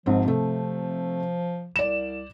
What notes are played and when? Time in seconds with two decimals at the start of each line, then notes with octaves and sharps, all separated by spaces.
0.06 G#1 G#2 F3 C4
0.25 C3 A3
1.76 C2 D5 E7